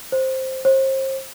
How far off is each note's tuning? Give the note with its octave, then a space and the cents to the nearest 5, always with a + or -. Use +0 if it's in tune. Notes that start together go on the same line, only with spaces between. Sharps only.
C5 +5
C5 +35